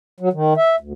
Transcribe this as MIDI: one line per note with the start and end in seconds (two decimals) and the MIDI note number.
0.20 0.29 54
0.33 0.54 51
0.57 0.76 76
0.80 0.93 38